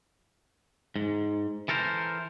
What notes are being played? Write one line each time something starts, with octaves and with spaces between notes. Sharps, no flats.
G#2
E3 A4 A#4 C5